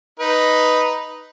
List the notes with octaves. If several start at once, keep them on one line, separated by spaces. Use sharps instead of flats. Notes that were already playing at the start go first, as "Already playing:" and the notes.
D#4 B4